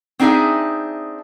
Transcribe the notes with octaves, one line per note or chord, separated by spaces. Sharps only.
C4 D4 D#4 G#4 E5